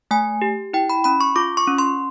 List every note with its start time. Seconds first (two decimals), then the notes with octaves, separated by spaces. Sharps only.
0.11 A3 G#5
0.42 G4
0.73 E4 G5
0.90 B5
1.04 C#4 B5
1.21 C#6
1.36 F4 D6
1.57 C#6
1.67 C#4
1.78 C6